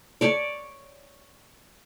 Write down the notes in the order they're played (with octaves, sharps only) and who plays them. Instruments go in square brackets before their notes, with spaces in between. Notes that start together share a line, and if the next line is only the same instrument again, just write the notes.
[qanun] C#5 D5